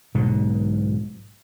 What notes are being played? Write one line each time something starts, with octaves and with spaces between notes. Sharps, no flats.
B1 G#2 B2 D3